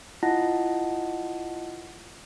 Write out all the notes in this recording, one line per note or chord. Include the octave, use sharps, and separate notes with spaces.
E4 F4 D#5 F#5 A5 A#6